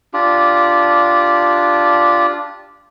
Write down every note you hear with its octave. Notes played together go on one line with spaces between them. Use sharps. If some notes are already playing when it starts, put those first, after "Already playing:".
D4 F4 G4